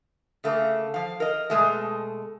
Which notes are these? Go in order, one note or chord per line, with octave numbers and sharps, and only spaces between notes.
C#3 A3 A#3
F3 F5
A#4 D#5
B2 G#3 A3